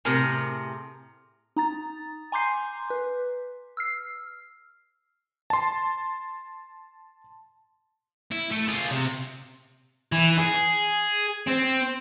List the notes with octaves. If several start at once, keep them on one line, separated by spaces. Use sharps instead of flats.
A2 C3 G#4 A#4 A#5
D#4 A#5 A6
G#5 A#5 C6 D6 G6 C7
B4
E6 F6 C7
A5 C6
E4
A3
F4 G#4
C3
E3
G#4
C4